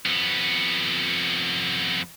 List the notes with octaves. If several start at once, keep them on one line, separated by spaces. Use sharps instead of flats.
F2 B3